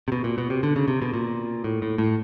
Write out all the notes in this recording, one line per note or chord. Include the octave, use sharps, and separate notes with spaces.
C3
B2
A#2
B2
C3
D3
C#3
C3
B2
A#2
A2
A2
A2